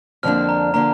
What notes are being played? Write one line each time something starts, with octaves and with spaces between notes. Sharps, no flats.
F2 D3 F3 A#3 D4 F6
A#5
D3 F3 A#3 D4 A#5